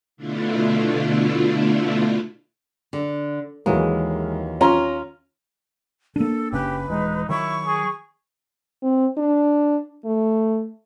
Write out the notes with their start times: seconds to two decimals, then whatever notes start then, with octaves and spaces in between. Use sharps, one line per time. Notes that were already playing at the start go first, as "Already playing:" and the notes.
0.17 B2 D3 A3 D4 E4 F4
2.93 D3
3.66 D#2 E3 F#3 G#3 A#3
4.61 C#4 F4 A#5
6.16 A#3 D4 A4
6.53 F#1 C#3 C#4 G4 B4
6.88 D#1 E3 G#3 D#4
7.29 D#3 F#3 E4 C#6
7.66 G#4
8.83 C4
9.18 D4
10.05 A3